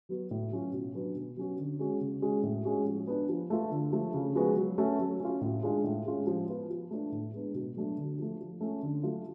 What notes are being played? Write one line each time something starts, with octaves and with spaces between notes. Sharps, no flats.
F#3 B3 F#4
A2
F#3 C#4 F4
B2
F#3 B3 D4 F#4
B2
F#3 C#4 F#4
D3
G#3 C#4 F#4
C#3
G#3 C#4 F#4
A2
G#3 C#4 F#4
F3
B3 D4
F3
A3 F4
D3
F3 A3
C#3
F3 G#3 B3 F#4
F#3
A3 C#4 F#4
F#3
C#4 F4
A2
G#3 D4 F4
A2
G#3 C#4 F4
F3
B3 F4
F3
A3 D4
A2
G#3 B3 D4
B2
F#3 A3 D4 F#4
D3
F3 A3
F3
A3 C#4
D3
F#3 A3 F4